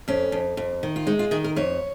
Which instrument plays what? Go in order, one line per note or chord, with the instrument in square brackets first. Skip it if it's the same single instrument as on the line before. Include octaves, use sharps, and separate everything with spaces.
[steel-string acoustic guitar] F2 C#4
F2
F2
D#3
F4
G#3 D#4
F4
D#3 G#4
A#4
F2 C#5